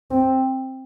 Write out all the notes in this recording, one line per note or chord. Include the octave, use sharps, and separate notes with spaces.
C4